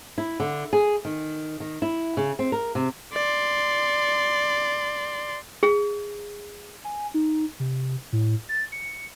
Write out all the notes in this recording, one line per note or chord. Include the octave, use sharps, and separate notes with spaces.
E4
D3
G#4
D#3
D#3
E4
C#3
C4
A#4
C3
D5 C6
G#4
G#5
D#4
C3
A2
A6
C#7